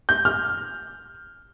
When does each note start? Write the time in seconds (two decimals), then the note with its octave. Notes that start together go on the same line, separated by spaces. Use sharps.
0.09 G6
0.25 F6